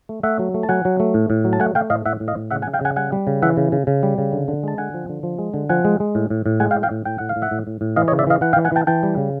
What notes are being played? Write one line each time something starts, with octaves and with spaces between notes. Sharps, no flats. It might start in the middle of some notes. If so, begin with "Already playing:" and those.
A3
A3 E5 F#5
F#3
A3
A5
F#3 F#5 G#5
F#3
A3
A2
A2
F#3
A5
A3 F#5 G#5
A3 F5 G5
A2 D#5 F5
A2 E5 F#5
A2
D#5 F5
A2
C#3 E5 F#5
F#5 G#5
C#3
F5 G5
C#3 F#5 G#5
G3 F#5 G#5
G3
C#3
E3 E5 F#5
C#3
C#3
C#3
G3
C#3
D3
D3
G#3 A5
D3 F#5 G#5
F3
D3
F3
G#3
D3
F3 F#5 G#5
G#3
G#3
A2
A2
A2
G#3 F#5 G#5
F5 G5
A2
F5 G5
A2
A2 G5
A2 F#5
F5
A2
E5 F#5
A2
A2
A2
E3 D#5 F5
C#5 D#5
C#3
D5 E5
E3 D#5 F5
E3 F#5
F5 G5
E3
F#5 G#5
E3 G5 A5
E3 G5 A5
G3
C#3